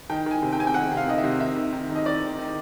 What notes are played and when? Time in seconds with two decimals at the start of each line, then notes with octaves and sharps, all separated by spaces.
0.10 D#3 G5
0.26 D#3 G#5
0.42 C3
0.52 G5
0.59 C3 G#5
0.67 G5
0.74 D#3 F#5
0.91 C3
0.97 F5
1.08 D#3 D#5
1.18 E5
1.24 C3
1.40 D#3 E5
1.56 D#3
1.72 D#3
1.89 D#3
1.95 D#5
2.05 D#3 D5
2.23 D#3
2.38 D#3